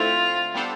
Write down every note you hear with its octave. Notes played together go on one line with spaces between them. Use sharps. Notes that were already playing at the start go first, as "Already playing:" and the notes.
Already playing: D3 A3 C4 E4 F4
G3 B3 D4 A4 C5